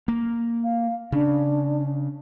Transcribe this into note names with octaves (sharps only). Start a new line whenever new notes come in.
A#3
F5
C#3 D4